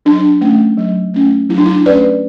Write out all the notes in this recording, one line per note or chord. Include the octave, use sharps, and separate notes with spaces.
F#3 D4
A3 C#4
F#3
A3 C#4
F#3 E4
D4
E4
A3 C#4 B4 D5